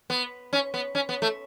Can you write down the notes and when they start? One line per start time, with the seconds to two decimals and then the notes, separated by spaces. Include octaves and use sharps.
0.10 B3
0.53 C#4
0.74 B3
0.95 C#4
1.09 B3
1.22 A3